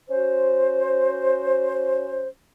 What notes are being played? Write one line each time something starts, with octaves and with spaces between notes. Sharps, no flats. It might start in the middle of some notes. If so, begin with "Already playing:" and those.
C#4 F#4 C5